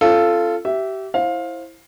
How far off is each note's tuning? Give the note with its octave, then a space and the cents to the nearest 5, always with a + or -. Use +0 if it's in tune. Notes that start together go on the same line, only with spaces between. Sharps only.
C#4 -45 F4 -15 A4 +0
G4 -30 E5 +0
E4 +0 C5 +25 F5 +15